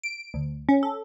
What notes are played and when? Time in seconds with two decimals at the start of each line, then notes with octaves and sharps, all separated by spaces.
0.03 D7
0.34 D2
0.69 C#4
0.83 A4